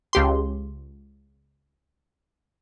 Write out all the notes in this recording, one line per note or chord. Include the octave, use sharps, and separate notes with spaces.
C#2 G4 C6